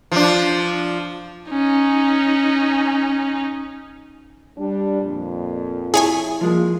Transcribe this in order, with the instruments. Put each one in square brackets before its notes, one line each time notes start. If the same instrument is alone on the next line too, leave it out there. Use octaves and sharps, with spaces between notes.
[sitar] F3 D4
[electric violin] C#4 D#4
[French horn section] G3 D4
F2 A#2
[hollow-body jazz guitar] E4 [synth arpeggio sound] G#4 C#5 G#5
[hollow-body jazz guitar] F3 G#3 [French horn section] A#3